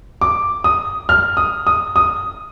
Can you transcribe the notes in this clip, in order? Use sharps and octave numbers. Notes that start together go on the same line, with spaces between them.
D6
D#6
F6
D#6
D#6
D#6